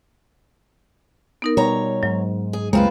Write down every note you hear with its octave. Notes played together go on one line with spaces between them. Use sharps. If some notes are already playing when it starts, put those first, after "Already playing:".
B3 D#4 A#4
B2 G3 C#5 A#5
G#2 F#3
G#4
C#2 F#2 G#3 A#3 C4 F4 B4